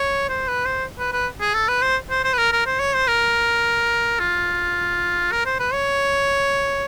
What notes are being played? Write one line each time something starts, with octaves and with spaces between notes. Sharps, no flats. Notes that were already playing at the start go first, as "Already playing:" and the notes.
Already playing: C#5
C5
B4
C5
B4
B4
G#4
A4
B4
C5
C5
C5
B4
A#4
A#4
C5
C#5
C5
A#4
F4
A#4
C5
B4
C#5